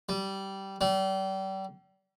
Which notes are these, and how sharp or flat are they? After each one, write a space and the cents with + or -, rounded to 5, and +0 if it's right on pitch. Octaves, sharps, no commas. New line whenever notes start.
G3 -15
G3 -35